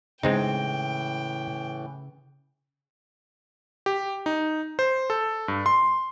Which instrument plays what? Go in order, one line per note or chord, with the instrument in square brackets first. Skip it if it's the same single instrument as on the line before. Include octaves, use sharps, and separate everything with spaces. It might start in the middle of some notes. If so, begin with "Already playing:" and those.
[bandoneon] A2 E3 [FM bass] C#3 [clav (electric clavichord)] G#3 C4 D#4 [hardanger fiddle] G5
[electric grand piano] G4
D#4
C5
A4
G2
C6